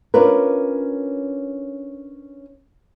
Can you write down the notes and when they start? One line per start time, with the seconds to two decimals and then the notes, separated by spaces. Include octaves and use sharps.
0.14 C#4 D4 F4 A#4 B4